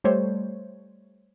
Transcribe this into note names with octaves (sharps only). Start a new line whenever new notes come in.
G3 A3 C5 C#5